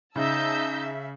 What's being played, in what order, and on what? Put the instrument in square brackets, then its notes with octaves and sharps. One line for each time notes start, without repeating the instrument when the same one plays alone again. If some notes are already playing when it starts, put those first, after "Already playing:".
[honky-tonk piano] C#3 [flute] D#4 [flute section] E5 [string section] A5 E6 G6